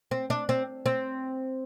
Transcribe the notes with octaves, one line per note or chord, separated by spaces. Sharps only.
C4
D4
C4
C4